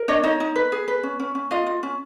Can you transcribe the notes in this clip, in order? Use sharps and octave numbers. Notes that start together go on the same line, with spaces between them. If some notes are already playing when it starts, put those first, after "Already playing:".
Already playing: A#4
D4 C#5 D#5
D#4 C#5 D#5
D#4
B4
G#4
B4
C#4
C#4
C#4
F4 D#5 F5
F4
C#4